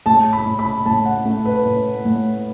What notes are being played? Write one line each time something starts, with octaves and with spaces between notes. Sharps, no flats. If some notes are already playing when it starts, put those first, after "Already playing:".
A2 A5
B5
A2
B5
A2 A5
F#5
A3
B4
A2
A2